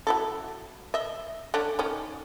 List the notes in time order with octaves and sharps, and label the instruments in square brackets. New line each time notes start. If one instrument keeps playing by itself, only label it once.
[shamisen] F#3 E4 A4
D#5 E5
D3 C#4 D4
D#3 C#4